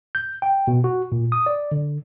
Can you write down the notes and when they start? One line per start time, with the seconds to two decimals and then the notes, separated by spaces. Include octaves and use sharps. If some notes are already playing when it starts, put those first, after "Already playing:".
0.15 G6
0.42 G5
0.67 B2
0.84 F#4
1.12 A#2
1.32 D#6
1.46 D5
1.72 D3